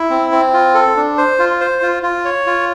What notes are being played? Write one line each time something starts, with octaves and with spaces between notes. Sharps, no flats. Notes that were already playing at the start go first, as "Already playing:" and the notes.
Already playing: E4
C4
C4
F4
A4
D4
C5
F4
C5
F4
F4
C#5
F4